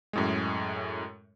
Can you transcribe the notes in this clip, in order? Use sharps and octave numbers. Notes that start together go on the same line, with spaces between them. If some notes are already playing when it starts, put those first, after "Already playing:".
F#2 A2 G#3